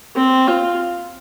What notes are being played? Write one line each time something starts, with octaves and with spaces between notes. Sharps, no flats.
C4
F4